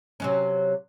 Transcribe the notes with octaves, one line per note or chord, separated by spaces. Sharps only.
C3 F#3 C#4